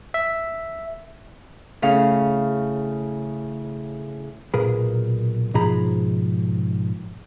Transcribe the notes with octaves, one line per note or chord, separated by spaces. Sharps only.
E5
A2 C#3 F5
B1 A#2 G#4 A#4 B4
G#2 B2 F3 G#4 A#5 B5